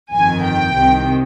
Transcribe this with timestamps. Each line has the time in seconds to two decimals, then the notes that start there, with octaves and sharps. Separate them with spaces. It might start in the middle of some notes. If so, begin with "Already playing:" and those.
0.12 G1 F2 D#3 G#5
0.42 G5
0.74 C2 C3 D#3